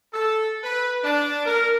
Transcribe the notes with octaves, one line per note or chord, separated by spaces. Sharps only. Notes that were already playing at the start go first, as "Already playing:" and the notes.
A4
B4
D4
A#4